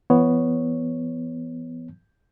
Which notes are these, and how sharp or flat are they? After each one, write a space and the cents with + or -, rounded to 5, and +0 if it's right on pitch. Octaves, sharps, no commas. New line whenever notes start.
E3 +35 B3 +0 C#5 +0